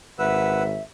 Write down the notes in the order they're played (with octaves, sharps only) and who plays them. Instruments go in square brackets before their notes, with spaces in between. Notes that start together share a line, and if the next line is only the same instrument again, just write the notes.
[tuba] G#1 [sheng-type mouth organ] B4 F#5 E6 [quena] E5